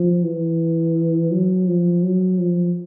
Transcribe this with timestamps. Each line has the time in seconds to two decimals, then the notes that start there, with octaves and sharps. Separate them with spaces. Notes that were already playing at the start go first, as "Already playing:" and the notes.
Already playing: F3
0.23 E3
1.31 F#3
1.67 F3
2.03 F#3
2.39 F3